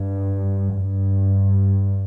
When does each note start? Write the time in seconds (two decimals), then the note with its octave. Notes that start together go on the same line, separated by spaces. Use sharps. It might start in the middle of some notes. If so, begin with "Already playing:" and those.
Already playing: G2
0.81 G2